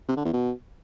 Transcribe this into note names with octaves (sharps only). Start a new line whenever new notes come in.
C3
D3
E2
B2